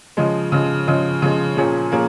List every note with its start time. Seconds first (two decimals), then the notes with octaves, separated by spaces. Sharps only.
0.17 C#3 F3 G#3
0.52 C#3 F3 G#3
0.87 C#3 F3 G#3
1.22 C#3 F3 G#3
1.56 A#2 F3 A#3 C#4 G#4
1.92 A#2 F3 A#3 C#4 G#4